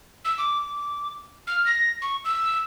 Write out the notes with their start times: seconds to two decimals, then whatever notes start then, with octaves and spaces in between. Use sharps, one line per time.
0.25 E6
0.38 D6
1.47 F6
1.66 A#6
2.02 C#6
2.25 E6